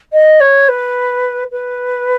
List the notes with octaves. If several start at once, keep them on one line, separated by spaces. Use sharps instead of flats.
D#5
C#5
B4
B4